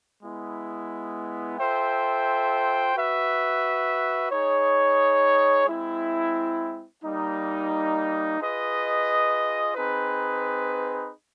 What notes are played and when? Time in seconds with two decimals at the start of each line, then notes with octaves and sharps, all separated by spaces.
0.22 G#3 B3 E4
1.58 F4 A4 C5 E5 G5
2.94 F#4 B4 E5
4.31 D#4 G#4 C#5
5.67 G#3 C4 E4
7.03 G3 A#3 D#4
8.39 F4 G#4 B4 D#5
9.75 C4 D#4 G#4 B4